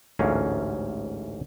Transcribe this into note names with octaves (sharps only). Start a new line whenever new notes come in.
A1 D2 G#2 C#4 A#4 F5